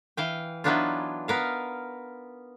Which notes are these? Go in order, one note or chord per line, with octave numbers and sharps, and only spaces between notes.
E3 F5 G5
E3 F#3 B3 D4 D#4 F4
B3 A#4 F5